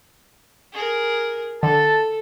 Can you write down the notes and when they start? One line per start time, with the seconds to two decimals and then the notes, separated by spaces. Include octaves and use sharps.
0.73 G#4 A#4
1.63 D3 A4 A5